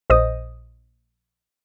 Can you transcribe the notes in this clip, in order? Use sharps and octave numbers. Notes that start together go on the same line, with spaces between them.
A#1 C5 D#5 D#6